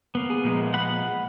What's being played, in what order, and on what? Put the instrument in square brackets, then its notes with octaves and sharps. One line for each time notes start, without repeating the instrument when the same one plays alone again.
[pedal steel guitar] A#3 B3
[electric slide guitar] G#4
A#2 F3 G#3
[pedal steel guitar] F#5 B5